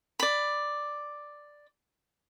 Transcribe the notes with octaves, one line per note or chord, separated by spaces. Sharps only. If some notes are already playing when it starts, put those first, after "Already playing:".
D5 B5